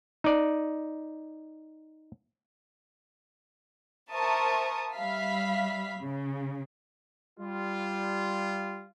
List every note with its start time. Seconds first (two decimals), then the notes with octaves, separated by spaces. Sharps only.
0.24 D#4 D5
4.12 A#4 C5 E5 A5 C#6 D#6
4.97 G3 E5 F5 B5 B6
6.01 C#3
7.38 G3 F4